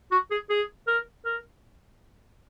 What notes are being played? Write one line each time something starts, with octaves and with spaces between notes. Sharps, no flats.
F#4
G#4
G#4
A#4
A#4